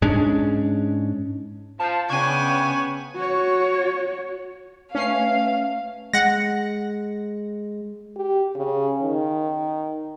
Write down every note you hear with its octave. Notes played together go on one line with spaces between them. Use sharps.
G#2 G#3 C#4 D4
F3 A5
C#3 B3 C#4 D4 G5 G#5 C#6
F#4 C#5
A3 C#4 B4 E5 F5 C7
G#3 F#5 A#6
G4
C#3
D#3